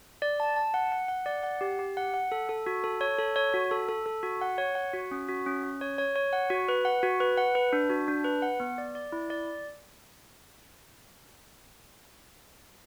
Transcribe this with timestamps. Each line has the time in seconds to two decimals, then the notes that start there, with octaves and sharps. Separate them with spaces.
0.22 D5
0.40 A5
0.56 A5
0.74 F#5
0.92 F#5
1.08 F#5
1.26 D5
1.43 F#5
1.61 G4
1.79 G4
1.97 F#5
2.14 F#5
2.32 A4
2.49 A4
2.66 F#4
2.84 A4
3.01 C#5
3.19 A4
3.36 C#5
3.54 F#4
3.71 A4
3.89 A4
4.06 A4
4.23 F#4
4.41 F#5
4.58 C#5
4.75 F#5
4.93 F#4
5.11 C#4
5.29 F#4
5.46 C#4
5.63 C#4
5.81 C#5
5.98 C#5
6.15 C#5
6.33 F#5
6.50 F#4
6.68 B4
6.85 F#5
7.03 F#4
7.20 B4
7.38 F#5
7.55 B4
7.73 D4
7.90 F#4
8.08 D4
8.24 B4
8.42 F#5
8.60 B3
8.78 D5
8.95 D5
9.12 E4
9.30 D5